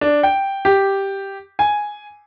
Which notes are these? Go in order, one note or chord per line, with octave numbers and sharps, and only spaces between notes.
D4
G5
G4
G#5